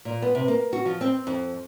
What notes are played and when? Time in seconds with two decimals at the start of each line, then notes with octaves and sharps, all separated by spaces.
0.05 A#2
0.22 B3
0.35 C3
0.48 A#3
0.73 F#4
0.85 F3
1.01 C4
1.27 F2